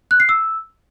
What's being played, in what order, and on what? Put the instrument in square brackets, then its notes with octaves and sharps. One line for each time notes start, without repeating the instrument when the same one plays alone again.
[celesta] F#6
C7
E6